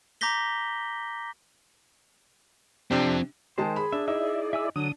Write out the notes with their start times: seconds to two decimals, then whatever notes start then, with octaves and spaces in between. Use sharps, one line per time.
0.21 A#5 D6 G6 A#6 B6 G7
2.91 C3 F3 C4 D4 G4
3.58 D#3 G#3 C5 G5 A5
3.76 G#4 B5
3.93 D4 E5
4.08 D#4 E4 D5 E5
4.53 E5 G#5 E6
4.76 D3 F#3 D4 D#6